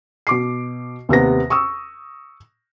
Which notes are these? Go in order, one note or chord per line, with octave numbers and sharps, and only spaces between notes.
B2 D6 C7
D#2 C3 B3 A#6
C#6 D#6 E6